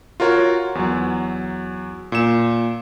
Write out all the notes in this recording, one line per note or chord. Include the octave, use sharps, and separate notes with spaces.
F4 F#4 A#4 C#5
E2 F#3
A#2 E7